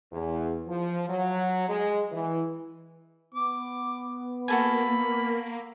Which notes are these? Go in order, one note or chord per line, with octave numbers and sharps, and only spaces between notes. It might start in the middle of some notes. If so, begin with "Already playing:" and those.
E2
F3
F#3
G#3
E3
B3 D6
A#3 F#4 A4 G#5 B5